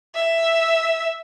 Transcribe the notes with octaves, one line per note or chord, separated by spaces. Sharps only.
E5